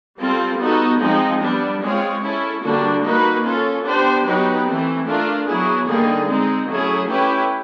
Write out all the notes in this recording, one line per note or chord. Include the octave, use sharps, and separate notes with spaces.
G3 C4 F4 A4
B3 D#4 F#4 A4
F3 G#3 C4 D#4
G3 B3 D4
G#3 C4 F4 G#4 C#5
C#4 E4 A4
D3 G3 A#3 D4 F#4
A#3 D#4 F#4 B4
C#4 F4 A4
B3 D4 G4 C5
F#3 B3 D#4 G4 B4
E3 A3 C4
A3 D4 F4 A#4
F#3 B3 E4 G#4
D3 G3 A#3 D#4 G#4
G#3 C4 D#4
F#3 A3 C#4 E4 G#4
A3 C#4 E4 G4 B4